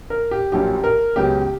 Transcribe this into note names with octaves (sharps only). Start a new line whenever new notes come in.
A#4
G4
A#1 A#2 F#3 C#4 G4
A#4
C#2 C#3 F#3 B3 G4